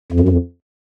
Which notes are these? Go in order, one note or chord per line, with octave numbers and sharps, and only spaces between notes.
F2
F#2
F2